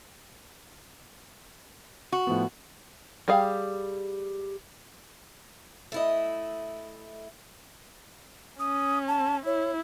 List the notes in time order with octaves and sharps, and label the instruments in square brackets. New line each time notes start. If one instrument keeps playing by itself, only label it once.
[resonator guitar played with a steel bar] F#4
[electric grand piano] A2 F3 B3
[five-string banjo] G3 G4 G#4 F5
[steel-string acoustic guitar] A3 E4 D#5
[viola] C#4 [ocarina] D#6
[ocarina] A5
[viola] E4 [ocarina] C#5